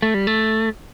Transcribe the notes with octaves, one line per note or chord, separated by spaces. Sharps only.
A3
G3
A3